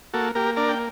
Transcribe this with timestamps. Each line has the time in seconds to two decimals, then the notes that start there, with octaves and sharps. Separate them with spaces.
0.13 A#3 F#4 A4
0.35 A#3 G4 A#4
0.56 D4 A#4 D5
0.69 G5